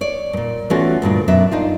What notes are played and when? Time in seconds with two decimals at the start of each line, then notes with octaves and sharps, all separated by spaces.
0.01 C#5 D5
0.33 G2 A#2
0.70 E3 A3 B3 C#4 F4 F#4
1.02 D2 G2 A#2 D4
1.28 F#2 B2 D4 E5
1.52 D4 D#4 F4